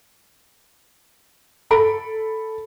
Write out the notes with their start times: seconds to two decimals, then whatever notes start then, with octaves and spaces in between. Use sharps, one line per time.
1.71 A4 B5 D7